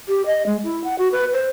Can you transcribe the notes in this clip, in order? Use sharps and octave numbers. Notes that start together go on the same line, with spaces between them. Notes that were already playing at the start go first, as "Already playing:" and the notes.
G4
D#5
G#3
E4
F#5
F#4
B4
C5